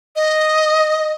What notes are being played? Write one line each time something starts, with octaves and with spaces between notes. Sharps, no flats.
D#5